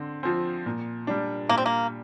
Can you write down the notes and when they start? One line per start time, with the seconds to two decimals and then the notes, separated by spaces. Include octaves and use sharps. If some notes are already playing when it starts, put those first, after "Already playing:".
Already playing: D3 C4
0.23 F3 C4
0.66 A#2
1.07 G3 D4
1.49 A#2 A#3
1.58 C4
1.66 A#3